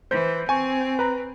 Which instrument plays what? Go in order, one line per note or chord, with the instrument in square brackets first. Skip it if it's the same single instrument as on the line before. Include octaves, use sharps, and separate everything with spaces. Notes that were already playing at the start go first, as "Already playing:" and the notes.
[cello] E3 [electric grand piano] C5 G6
[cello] C4 [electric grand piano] G#5 C#6
[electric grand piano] B4 A#5